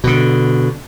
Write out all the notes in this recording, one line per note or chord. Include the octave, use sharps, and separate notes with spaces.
B2 D3